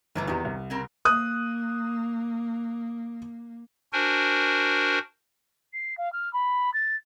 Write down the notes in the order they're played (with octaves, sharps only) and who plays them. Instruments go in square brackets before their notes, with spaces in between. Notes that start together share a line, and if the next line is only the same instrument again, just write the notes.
[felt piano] G1 [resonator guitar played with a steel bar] D#3 E3 A3
[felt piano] E2 G4 [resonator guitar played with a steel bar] C3 D#3
[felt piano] C2
[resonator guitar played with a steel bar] C#3 C4 A#4
[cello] A#3 [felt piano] D#6 F#6
[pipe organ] D4 F#4 A#4 C5 G#5
[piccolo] C7
F5
F6
B5
A6